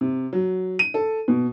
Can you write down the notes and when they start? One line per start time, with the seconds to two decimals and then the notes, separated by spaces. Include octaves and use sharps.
0.01 C3
0.33 F#3
0.79 D#7
0.94 A4
1.28 B2